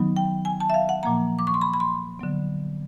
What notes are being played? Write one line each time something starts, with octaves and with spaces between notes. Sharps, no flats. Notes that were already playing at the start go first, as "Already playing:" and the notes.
Already playing: D#3 F#3 B3 D#4
G5
G#5
A5
E5
F5
F#5
A#2 F3 A#3 A#5
D6
C#6
C6
B5
B5
C6
D3 F#3 B3